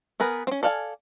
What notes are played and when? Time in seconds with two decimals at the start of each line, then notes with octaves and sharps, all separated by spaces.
0.20 B3 G#4 A#4 B4
0.47 C4 C#4
0.63 A4 D5 F5 G5 G#5